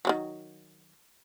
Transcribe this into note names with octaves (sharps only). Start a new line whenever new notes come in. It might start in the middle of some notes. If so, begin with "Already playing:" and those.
D#3 E3 F#3